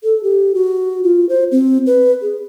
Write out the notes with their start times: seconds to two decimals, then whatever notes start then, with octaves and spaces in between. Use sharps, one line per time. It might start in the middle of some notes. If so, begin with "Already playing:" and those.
0.04 A4
0.23 G4
0.55 F#4
1.03 F4
1.29 C5
1.52 C4
1.86 B4
2.22 G#4